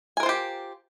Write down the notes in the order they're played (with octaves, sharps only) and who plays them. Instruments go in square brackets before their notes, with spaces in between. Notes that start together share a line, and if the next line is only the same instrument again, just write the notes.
[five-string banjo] G#5
A#4
C5
F4
G4